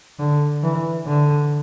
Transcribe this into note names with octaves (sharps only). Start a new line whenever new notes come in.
D3
E3
D3